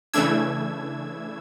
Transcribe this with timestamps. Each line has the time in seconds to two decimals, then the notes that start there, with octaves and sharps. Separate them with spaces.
0.14 C#3 E3 A3 D4 E6 G#6